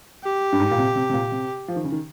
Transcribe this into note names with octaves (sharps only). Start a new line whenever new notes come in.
G4
G2
G#2
A#2
C3
C3
C3
A#2
C3
F3
D#3
C#3
D#3